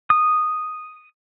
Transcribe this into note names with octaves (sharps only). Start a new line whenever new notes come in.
D#6